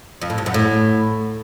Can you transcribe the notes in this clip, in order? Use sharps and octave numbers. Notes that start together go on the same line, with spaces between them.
F2
A2
G2
F#2
A2